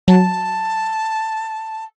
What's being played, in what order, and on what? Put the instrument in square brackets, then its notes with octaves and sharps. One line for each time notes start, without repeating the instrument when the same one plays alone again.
[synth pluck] F#3 [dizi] A5